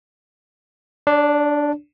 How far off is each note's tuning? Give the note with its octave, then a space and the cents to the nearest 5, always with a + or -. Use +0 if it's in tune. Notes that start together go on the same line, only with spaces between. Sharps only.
D4 +0 C#5 +45